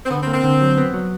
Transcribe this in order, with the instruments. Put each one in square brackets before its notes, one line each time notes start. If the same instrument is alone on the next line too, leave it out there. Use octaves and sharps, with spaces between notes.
[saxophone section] C4
[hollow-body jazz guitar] D3 [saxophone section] B3
[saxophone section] C4
[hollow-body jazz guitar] A#3
[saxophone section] C4
[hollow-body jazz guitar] D3
F#3
B3
F#3